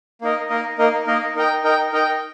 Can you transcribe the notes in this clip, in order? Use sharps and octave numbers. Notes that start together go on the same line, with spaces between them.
A#3 D#4 A#4 D#5
A#3 D#4 A#4 D#5
A#3 D#4 A#4 D#5
A#3 D#4 A#4 D#5
D#4 A#4 D#5 G5
D#4 A#4 D#5 G5
D#4 A#4 D#5 G5